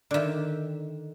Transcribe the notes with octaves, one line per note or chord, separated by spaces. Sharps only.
D3 D#3 D5 E5